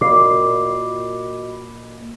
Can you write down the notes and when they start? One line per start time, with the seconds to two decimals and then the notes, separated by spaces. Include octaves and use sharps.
0.01 A#2 F#4 D#5 B5 D6 C7